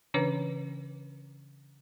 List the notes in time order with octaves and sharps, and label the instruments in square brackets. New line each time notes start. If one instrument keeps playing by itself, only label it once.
[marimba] C#3 E3 C#4 D4 B4 C#5